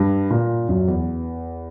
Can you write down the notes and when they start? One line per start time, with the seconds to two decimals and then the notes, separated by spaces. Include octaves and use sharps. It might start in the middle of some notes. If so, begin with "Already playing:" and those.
Already playing: G2
0.30 A#2
0.69 F#2
0.88 E2